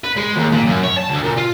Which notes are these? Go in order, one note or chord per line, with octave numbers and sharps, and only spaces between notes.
B4
G#3
D#2
A#2
F#2
C#5
A5
D2
A#2
F4